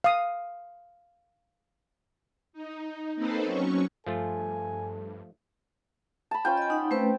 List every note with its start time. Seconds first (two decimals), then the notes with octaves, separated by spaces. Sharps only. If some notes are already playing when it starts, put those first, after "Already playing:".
0.04 F5 D#6
2.53 D#4
3.15 A#3 C4 D#4 A4 B4 C5
3.44 F#3 C#4 C#6
4.06 G2 F3 A3 F4 A4 G#5
6.31 A5 B5
6.45 C#4 F4 G5
6.57 D#5 G#5
6.70 D#4 F#5
6.91 A3 C4 C#4 B4